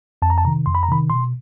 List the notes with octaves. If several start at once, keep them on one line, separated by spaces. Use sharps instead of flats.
F2 A5
A#5
A5
C3 D#3 A#5
F2 C6
B5
A#5
C3 D#3 B5
B2 C6